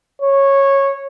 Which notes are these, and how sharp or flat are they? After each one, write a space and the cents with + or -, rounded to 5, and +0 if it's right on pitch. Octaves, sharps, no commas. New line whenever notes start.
C#5 -10